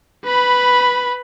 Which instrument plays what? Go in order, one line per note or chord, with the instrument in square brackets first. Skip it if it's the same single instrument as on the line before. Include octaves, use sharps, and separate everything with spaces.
[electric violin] B4 B5